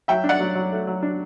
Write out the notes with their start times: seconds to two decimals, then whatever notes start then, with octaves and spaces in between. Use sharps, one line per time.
0.08 F#3 E5 G5
0.24 D4
0.29 D5 F#5
0.40 F#3
0.55 F#3
0.72 A3
0.87 F#3
1.03 D4